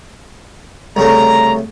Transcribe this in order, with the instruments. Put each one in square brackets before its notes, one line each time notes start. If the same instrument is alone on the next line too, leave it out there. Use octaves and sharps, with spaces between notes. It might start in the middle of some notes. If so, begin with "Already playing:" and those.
[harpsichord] C2 C#3 A3 [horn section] A#5